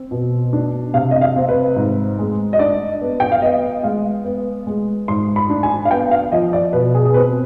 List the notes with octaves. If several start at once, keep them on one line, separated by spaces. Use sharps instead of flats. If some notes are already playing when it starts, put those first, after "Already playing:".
Already playing: C4
B2
D4
C3 F5
D#5
F5
C4
B4
G#2
G#3
D#5
D4 D5
B3
G5
F5
B3 D#5
G#3 F5
B3
G#3
G#2 C6
B5
D4
G#5
F5
B3 G5
F5
F3 D#5
D5
B2 B4
G#4
G#4
C4 B4